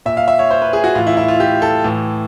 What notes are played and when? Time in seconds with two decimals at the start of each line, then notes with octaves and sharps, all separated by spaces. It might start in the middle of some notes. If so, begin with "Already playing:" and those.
0.06 A#2 E5
0.17 F5
0.28 E5
0.39 C#5
0.50 C5
0.62 B4
0.73 G#4
0.84 F#4
0.95 A2 E3 F4
1.07 E4
1.17 E4
1.28 F4
1.40 G4
1.62 A4
1.84 A2 E3